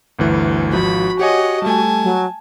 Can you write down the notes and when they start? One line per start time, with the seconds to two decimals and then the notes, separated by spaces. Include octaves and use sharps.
0.19 G1 D2 E3
0.73 G#1 F3 F#4 B5
1.19 G4 C#5 D#5 F#5 G#5
1.62 G3 A3 G#5 A5
2.03 F#3